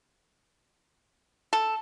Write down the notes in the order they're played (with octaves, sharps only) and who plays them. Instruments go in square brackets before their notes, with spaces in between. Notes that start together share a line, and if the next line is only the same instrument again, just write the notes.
[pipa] A4